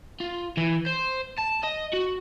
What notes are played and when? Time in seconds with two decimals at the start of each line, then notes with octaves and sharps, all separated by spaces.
0.20 F4
0.57 E3
0.86 C5
1.38 A5
1.63 D#5
1.93 F#4